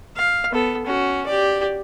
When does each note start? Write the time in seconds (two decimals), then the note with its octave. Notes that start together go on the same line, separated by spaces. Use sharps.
0.16 F5
0.52 B3 A4
0.86 C#4 F#4
1.26 G4 D5